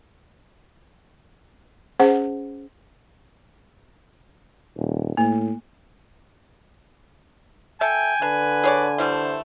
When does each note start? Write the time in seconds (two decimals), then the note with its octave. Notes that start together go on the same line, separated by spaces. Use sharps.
2.00 C#4 G#4 C5 F#5
4.77 D#1
5.17 A2 A#3
7.81 A4 E5 G5 G#5
8.22 D3 D4 B4
8.64 G#4 C#5 D5
8.98 E3 G3 A3 C5